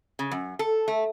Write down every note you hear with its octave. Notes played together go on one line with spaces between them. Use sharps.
C#3
F#2
A4
A3